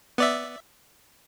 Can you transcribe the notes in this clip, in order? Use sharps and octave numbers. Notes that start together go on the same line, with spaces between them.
B3 D5 E5